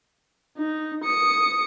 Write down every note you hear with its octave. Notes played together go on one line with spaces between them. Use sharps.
D#4
D#6 C#7